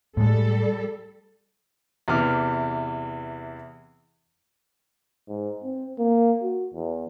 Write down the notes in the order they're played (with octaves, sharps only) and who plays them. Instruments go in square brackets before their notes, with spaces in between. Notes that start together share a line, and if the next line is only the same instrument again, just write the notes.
[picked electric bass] A2 G#3 [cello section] G3 A4
[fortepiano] E2 C3 E3 D6 F6
[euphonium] G#2
C4
A#3
F#4
E2